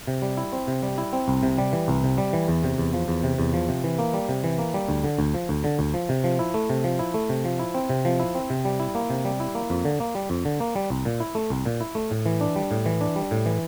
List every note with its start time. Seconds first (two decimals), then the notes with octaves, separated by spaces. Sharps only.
0.07 C3
0.22 G3
0.37 E4
0.53 C4
0.67 C3
0.83 G3
0.98 E4
1.13 C4
1.28 C2
1.43 C3
1.58 G3
1.73 E3
1.88 C2
2.03 C3
2.18 G3
2.33 E3
2.48 E2
2.63 C3
2.78 E2
2.93 F3
3.08 E2
3.23 C3
3.39 E2
3.53 F3
3.69 C3
3.84 E3
3.99 A#3
4.13 G3
4.29 C3
4.44 E3
4.59 A#3
4.74 G3
4.89 D2
5.04 D3
5.19 D2
5.34 F3
5.49 D2
5.64 D3
5.79 D2
5.94 F3
6.09 C3
6.24 F3
6.39 E4
6.54 A3
6.69 C3
6.84 F3
6.99 E4
7.14 A3
7.29 C3
7.45 F3
7.59 E4
7.74 C4
7.89 C3
8.05 F3
8.20 E4
8.35 C4
8.50 C3
8.65 G3
8.80 E4
8.95 A#3
9.10 C3
9.25 G3
9.40 E4
9.55 A#3
9.70 F2
9.85 D3
10.00 A#3
10.15 G3
10.30 F2
10.45 D3
10.60 A#3
10.76 G3
10.90 C2
11.05 A#2
11.20 E4
11.35 A3
11.50 C2
11.65 A#2
11.81 E4
11.95 A3
12.11 A2
12.26 E3
12.41 D4
12.56 G3
12.71 A2
12.86 E3
13.01 D4
13.16 G3
13.31 A2
13.46 E3